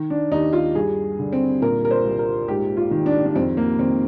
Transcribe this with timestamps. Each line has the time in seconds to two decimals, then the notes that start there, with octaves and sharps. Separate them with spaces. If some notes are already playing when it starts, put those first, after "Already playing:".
Already playing: D#3
0.10 D4
0.31 D#2 D#4
0.53 F4
0.75 G2 G#4
1.19 D3
1.32 C4
1.62 A#2 A#4
1.85 A#4
1.91 C5
2.05 C2
2.19 A#4
2.48 G#2 G4
2.77 F4
2.91 D#3
3.06 D4
3.26 D4
3.35 F2 C4
3.57 A#3
3.79 D#3 C4